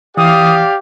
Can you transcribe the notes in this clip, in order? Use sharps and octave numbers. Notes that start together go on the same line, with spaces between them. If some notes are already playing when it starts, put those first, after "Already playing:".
E3 G4 D5 F5 D#6